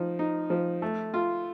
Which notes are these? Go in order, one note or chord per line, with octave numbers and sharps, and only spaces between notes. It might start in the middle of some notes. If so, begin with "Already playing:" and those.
Already playing: F3 D#4
D#4
F3
A3
F4